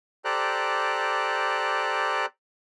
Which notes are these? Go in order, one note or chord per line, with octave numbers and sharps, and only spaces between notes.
G4 A4 C5 D5 A#5 F#6